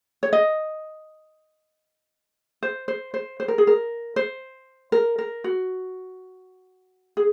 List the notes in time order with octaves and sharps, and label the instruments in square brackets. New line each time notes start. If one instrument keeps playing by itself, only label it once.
[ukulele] C#5
D#5
C5
C5
C5
C5
A#4
G#4
A#4
C5
A#4
A#4
F#4
G#4